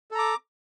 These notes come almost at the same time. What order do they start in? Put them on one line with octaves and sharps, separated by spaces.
A4 A#5 D6